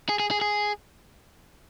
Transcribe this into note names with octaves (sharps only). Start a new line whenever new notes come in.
G#4
G#4
G#4
G#4